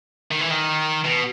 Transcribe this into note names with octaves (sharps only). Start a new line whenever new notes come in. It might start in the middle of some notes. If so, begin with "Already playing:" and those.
D#3
E3
D#3
B2